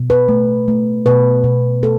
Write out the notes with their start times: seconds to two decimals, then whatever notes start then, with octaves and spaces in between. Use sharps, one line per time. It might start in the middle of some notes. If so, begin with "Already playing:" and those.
Already playing: B2
0.10 B4
0.28 A3
0.68 A3
1.06 B2 B4
1.44 B2
1.83 A3 A4